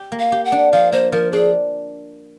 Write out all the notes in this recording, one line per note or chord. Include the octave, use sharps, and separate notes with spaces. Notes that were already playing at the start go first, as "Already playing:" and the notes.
Already playing: G4
A#3
F5
G4
F#5
D4
F3 F5
A#3 C5
F3 A#4
D4 G#4